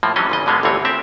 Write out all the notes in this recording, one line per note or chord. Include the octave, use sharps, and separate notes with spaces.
A2 F3 A#3
E3 F#3 G3 C4 C#4 D#5
G#1 C#3 D#5
B2 D3 G#3 A#3 B3
G1 D2 E3 C4 C#5
C4 G4 E5